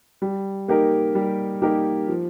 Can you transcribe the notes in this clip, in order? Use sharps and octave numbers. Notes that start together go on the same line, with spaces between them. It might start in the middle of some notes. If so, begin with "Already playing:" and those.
G3
A#3 D#4 G4 A#4
G3
A#3 D#4 G4 A#4
F3